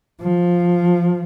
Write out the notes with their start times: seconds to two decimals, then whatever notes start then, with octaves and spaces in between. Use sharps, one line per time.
0.21 F3